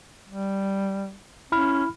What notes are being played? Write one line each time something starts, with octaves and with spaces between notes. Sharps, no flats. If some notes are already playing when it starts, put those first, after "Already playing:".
G3
C#4 E4 B5 F6